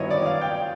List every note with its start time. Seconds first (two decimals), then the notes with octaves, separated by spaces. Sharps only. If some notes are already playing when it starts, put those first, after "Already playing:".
Already playing: G2 D#3 F#3 B3 E4 C#5 D#5
0.10 D5
0.26 F5
0.41 G5